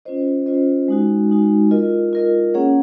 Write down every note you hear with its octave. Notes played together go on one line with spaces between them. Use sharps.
C#4 F4 C5 D#5
C#4 F4 C5 D#5
G#3 D#4 F#4
G#3 D#4 F#4
F4 A#4 D#5
F4 A#4 D#5
A#3 C#4 G#4 C#5 F#5